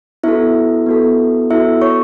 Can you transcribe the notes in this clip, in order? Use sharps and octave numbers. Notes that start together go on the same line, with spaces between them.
B3 E4 F#4 A4 E5
B3 F#4 A4
B3 E4 F#4 A4 E5
C#5 C#6